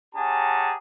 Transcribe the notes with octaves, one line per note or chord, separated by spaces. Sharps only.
C#4 G4 G#4 F#5 A5 A#5